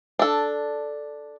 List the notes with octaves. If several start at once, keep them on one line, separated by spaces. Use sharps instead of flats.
D4 A4